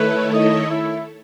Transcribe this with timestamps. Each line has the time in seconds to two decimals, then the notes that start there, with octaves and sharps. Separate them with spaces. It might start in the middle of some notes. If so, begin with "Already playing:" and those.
Already playing: D#3 A3 E4 A4 B4 C#5
0.33 D#5
0.70 E4